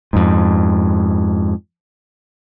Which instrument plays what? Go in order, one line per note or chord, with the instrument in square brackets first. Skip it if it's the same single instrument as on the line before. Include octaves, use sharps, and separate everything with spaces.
[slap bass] F2 G#2